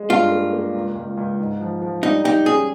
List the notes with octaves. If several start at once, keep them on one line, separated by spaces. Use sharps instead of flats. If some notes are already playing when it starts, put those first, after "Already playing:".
Already playing: G#3
G2 F4
A#3
A#3
C#2
C#2
C#2
G#2
F3
F3
G3 D#4
D#4 G4
C#4 G#4